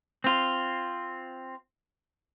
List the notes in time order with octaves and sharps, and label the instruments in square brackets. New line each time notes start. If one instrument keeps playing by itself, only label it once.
[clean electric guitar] C4 F4